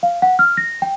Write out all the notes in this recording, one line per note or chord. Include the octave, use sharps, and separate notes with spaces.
F5
F#5
F6
A#6
G5